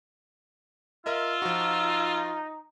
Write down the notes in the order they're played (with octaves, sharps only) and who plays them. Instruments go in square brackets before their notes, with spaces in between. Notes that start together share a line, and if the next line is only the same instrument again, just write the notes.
[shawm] F4 [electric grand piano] A#4 D#5 E5 [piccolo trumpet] E6
[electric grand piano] F3 F#4 [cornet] D#4